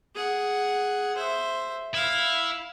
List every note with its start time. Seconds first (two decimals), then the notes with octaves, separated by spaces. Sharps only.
0.15 G#4 F#5
1.16 C5 E5
1.95 E4 F5